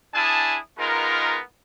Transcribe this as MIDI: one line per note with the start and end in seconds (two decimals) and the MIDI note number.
0.14 0.58 62
0.14 0.58 64
0.14 0.58 68
0.14 0.58 80
0.14 0.58 81
0.14 0.58 87
0.78 1.40 56
0.78 1.40 59
0.78 1.40 63
0.78 1.40 65
0.78 1.40 70